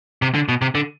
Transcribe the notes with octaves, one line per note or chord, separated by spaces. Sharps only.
C3
D3
B2
C3
D3